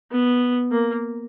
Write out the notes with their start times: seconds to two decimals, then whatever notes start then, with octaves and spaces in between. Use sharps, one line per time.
0.11 B3
0.71 A#3